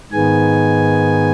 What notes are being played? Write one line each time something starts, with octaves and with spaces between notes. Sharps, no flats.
G#2 D#3 G#3 B3 G#5